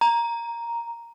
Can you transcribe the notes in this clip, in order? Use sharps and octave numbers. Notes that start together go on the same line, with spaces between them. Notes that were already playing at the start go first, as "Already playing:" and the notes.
A#5